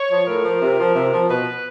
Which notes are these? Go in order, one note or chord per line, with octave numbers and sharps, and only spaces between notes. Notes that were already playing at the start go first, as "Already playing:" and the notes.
Already playing: C#5
F3
A2 A#4
F3
C3
F3
C3
F3
B2 B4